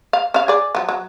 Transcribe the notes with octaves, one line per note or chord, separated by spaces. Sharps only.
F5
C#4 F5
G#4 D5
F3 F#3
F#3